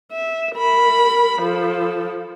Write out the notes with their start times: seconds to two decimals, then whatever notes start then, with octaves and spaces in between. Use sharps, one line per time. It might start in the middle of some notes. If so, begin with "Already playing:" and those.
0.12 E5
0.55 A#4 B5
1.40 F3 A4